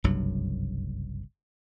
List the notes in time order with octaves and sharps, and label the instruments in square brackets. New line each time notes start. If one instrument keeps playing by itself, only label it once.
[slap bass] F#1 C2 G2 F#3